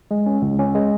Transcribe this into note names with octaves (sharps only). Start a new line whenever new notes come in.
G#3
C#4
C#2
C#4
G#3